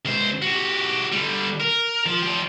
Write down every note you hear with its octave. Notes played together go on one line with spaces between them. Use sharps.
C#2 C5
F#4 G4
D3 G3
A#4
F3
F3 G4